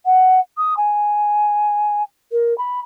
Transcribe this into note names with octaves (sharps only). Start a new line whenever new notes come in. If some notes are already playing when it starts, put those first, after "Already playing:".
F#5
D#6
G#5
A#4
B5